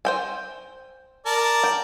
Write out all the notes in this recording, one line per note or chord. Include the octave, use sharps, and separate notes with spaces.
C5 G5 G#5
A#4 D5 A5
G5